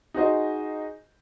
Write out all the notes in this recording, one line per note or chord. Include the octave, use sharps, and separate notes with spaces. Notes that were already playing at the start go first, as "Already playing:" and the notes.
D#4 F#4 G#4 C5 D#5